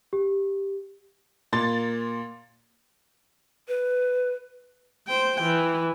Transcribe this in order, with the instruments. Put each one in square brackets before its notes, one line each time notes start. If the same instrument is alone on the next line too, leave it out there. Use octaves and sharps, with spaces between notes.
[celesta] G4
[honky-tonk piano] A#2 A#3 C6 A6
[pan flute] B4
[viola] C5 G5
E3